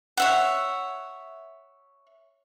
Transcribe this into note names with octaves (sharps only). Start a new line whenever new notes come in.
C#5 E5 F#5